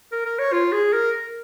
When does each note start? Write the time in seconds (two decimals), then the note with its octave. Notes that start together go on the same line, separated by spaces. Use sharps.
0.12 A#4
0.26 A#4
0.39 C#5
0.52 F4
0.72 G#4
0.93 A#4